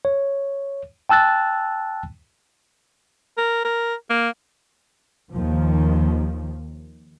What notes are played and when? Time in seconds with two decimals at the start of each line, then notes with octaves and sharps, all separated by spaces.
0.05 C#5
1.09 G5 A5 E6 F#6 A6
3.38 A#4
3.65 A#4
4.10 A#3
5.33 D#2 D#3 F3